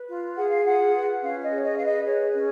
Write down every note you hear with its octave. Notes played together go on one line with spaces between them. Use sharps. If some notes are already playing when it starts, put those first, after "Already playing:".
Already playing: B4
F4
G#4 F#5
F5
F4 F#5
B4
C#4 F5
D#5
G#4 C#5
D#5
B4 F5
D#5
G#4 C#5
C#4